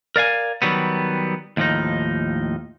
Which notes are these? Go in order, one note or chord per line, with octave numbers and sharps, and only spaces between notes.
A#4 D5 F5 G#5
D#3 F#3 G3 B3
D#2 A2 F3 D#4